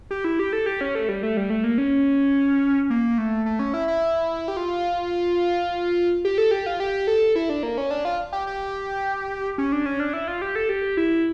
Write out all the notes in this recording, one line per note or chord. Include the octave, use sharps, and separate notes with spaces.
G4
E4
G4
A4
G4
C#4
A3
G3
A3
G3
A3
A#3
C#4
A#3
A3
A3
C#4
E4
E4
G4
F4
G4
A4
G4
F4
G4
A4
E4
D4
A#3
C#4
D4
F4
G4
G4
C#4
D4
C#4
D4
E4
F4
G4
A4
G4
E4